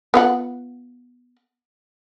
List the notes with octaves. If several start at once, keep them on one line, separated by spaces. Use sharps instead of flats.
B3 F4 F#5